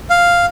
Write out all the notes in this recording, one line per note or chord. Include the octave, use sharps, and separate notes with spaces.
F5